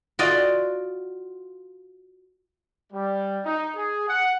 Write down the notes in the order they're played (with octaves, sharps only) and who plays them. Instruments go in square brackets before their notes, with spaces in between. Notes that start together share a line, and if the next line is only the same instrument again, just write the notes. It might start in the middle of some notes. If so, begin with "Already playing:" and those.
[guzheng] F4 F#4 D5 D#5
[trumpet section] G3
D#4
G#4
F#5